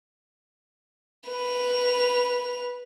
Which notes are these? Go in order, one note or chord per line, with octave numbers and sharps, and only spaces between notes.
B4 F7